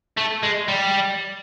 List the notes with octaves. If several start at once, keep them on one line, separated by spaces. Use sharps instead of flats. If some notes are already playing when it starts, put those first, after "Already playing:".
A3
G#3
G3